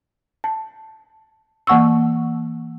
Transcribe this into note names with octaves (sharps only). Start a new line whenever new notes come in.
A5
E3 A#3 F#5 C#6 E6